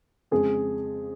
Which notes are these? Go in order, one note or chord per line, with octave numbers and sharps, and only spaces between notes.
F2 C#3 G#3 G#4